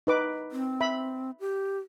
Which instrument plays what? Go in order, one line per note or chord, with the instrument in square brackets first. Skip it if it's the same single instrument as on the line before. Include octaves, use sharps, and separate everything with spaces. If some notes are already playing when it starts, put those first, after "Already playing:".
[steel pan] D#4 B4 D6
[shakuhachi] C4
[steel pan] E5 B5
[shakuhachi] G4